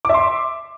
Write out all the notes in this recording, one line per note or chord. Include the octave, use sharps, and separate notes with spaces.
E5 C6 D6